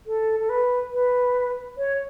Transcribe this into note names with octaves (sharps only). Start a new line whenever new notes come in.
A4
A4
B4
B4
C#5